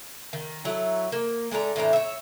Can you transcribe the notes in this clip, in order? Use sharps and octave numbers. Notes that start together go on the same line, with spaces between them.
D#3
F#3 A3 E4 A#5
A#3
G#3 A3 D4 A#5
A2 E3 D4 A#5
C#5 E5